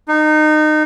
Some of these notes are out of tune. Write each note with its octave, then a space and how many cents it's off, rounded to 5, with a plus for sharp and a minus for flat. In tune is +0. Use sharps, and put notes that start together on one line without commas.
D#4 -25